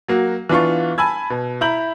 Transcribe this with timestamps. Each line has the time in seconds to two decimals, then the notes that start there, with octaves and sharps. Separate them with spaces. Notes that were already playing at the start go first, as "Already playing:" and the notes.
0.08 F#3 A#3 F#4
0.49 E3 B3 D4 F4 F5 C#6
0.98 G#5 A5 B5 E6 G#6
1.30 B2
1.61 E4 A#5 B5 G6 F#7